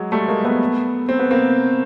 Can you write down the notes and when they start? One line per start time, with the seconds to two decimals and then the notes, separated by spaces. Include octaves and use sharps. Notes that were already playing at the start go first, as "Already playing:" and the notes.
Already playing: F#3 G#3
0.12 G3 A3
0.28 G#3 A#3
0.45 A3 B3
1.09 C4
1.19 B3
1.31 A#3 C4